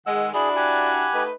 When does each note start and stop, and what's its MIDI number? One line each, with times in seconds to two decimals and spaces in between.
0.06 0.34 51
0.06 0.34 56
0.06 0.28 78
0.06 0.29 88
0.34 1.07 62
0.34 1.07 64
0.34 1.07 66
0.34 0.49 68
0.34 0.92 74
0.34 1.23 83
0.56 1.23 67
0.56 1.23 78
0.56 1.23 80
1.14 1.30 57
1.14 1.30 63
1.14 1.33 71